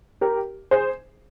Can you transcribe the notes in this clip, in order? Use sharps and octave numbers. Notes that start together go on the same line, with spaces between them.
G4 A#4
G#4 C5